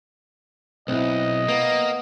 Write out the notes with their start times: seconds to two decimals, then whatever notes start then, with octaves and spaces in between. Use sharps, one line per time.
0.88 B1 C4 E4 D#5
1.48 A#3 B3